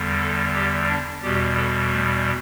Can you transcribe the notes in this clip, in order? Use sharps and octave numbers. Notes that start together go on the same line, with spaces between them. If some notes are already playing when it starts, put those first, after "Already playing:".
Already playing: E2 D3 G3
A4
G4
D4
E2 B2 G3 G4
A4
A3